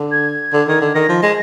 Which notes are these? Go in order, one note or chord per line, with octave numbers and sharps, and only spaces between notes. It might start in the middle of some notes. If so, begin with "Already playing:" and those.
Already playing: D3
G#6
D3
D#3
D3
D#3 A#6
F3
G#3